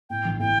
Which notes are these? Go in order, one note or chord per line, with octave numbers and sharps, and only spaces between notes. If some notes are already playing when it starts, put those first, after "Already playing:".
A2 G5
A1
A2 G5